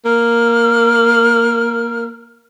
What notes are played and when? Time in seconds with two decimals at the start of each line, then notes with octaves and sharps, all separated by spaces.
0.05 A#3 F6